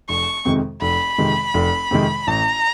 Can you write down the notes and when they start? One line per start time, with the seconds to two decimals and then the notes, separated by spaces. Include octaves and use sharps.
0.09 F1 C#6
0.45 F2 C3 D#3 G#3
0.81 F1 B5
1.18 F2 C3 D#3 G#3
1.54 F1
1.91 F2 C3 D#3 G#3
2.27 A1 A#5